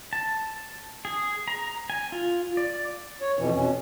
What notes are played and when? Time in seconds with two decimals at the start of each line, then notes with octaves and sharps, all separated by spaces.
0.13 A5
1.05 G#4
1.48 A#5
1.90 G#5
2.12 F4
2.57 D5
3.21 C#5
3.38 F2 B2 E3
3.54 B2 C#4